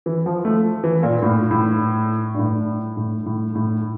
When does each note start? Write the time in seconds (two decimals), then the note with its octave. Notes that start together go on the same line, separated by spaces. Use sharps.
0.06 E3
0.26 F3
0.45 A3
0.84 E3
1.03 A#2
1.22 A2
1.51 A2
2.34 G2
2.39 A2
2.97 A2
3.26 A2
3.55 A2